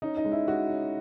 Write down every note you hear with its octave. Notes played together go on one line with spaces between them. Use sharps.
C#4 D#4
D#4
G#3
E4
G#3 F#4
C#4